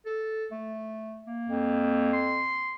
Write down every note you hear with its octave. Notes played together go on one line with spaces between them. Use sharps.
A4
A3
A#3
F2
C6